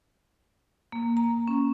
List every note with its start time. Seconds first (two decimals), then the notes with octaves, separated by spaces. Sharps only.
0.92 A#3
1.17 A#5
1.48 C#4